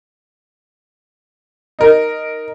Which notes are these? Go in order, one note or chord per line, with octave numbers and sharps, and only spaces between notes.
D#4 A#4